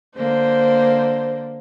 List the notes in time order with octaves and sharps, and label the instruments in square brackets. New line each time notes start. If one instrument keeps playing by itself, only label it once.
[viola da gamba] D3 A#3 [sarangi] C5